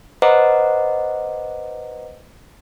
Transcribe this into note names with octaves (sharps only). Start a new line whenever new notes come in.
B4 C5 D#5 F#5 A#5 D6